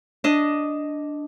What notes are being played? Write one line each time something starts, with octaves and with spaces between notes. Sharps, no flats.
D4 D#5